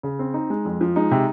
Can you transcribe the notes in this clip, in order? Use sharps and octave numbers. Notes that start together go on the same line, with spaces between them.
C#3
C4
D#4
G#3
F2
F3
G#3 D#4
C3